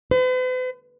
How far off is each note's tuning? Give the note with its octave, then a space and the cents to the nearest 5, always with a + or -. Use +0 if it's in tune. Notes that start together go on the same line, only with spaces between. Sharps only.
B4 +45